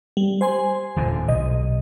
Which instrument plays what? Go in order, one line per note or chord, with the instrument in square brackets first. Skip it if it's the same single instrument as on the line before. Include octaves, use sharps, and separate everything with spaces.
[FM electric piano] G3
C5 G#5 C6
[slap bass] D#1 A#2 D3
[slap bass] B1 [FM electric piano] D#5